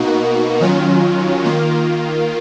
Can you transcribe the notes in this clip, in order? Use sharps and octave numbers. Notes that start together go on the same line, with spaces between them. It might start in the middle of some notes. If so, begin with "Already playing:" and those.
Already playing: B2 A#3 D#4 F#4
D#3 F#3 C#4 F4
D#3 A#3 F4